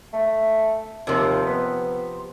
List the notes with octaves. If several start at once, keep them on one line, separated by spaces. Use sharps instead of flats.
A3
D#2 C3 F3
B3